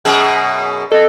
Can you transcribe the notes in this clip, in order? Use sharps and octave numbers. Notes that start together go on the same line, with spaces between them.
F#2 B2 G#4
A4 D#5